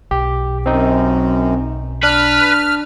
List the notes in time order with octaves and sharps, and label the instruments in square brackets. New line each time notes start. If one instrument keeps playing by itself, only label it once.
[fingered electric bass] B1 [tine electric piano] G4
[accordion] F#2 [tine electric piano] C4 D#4
[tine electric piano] D4 [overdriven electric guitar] B4 [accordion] F6